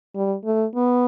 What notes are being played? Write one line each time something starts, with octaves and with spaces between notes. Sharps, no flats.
G3
A3
B3